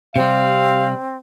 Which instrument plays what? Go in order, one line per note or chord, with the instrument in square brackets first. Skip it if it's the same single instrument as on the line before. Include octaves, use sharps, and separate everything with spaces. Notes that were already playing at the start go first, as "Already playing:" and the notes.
[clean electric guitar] C3 G3 [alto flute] C4 [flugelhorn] F5